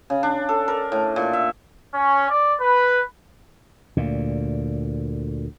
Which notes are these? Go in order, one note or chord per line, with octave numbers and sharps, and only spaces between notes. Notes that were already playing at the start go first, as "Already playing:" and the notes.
C#3
D4
A4
A#4
A2
A#2
E5
C#4
D5
B4
D2 A#2